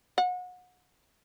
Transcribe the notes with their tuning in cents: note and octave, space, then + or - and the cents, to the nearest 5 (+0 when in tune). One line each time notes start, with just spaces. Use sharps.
F#5 -30